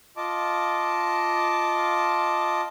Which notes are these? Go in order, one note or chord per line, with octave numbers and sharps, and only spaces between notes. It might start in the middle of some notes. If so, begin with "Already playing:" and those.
F4 D#5 A5 D6